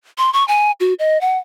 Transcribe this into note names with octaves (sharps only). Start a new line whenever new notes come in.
C6
C#6
G#5
F#4
D#5
F#5